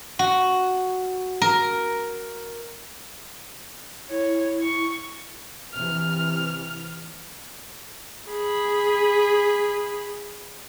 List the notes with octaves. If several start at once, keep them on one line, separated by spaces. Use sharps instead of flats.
F#4
A#4
E4 C#5
C#6
C3 E3 F6
G#4 B5